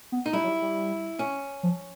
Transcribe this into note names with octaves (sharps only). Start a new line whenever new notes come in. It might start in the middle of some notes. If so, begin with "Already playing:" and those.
B3
D#4
G3 E4
F#3
G3
G3
C#4
F3